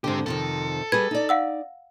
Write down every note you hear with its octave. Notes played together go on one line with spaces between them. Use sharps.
G#2 D3 C4 G4
F2 C3 D#3 A4
G3 G#4 B4 G#6
D#4 D5
F5 F#5 E6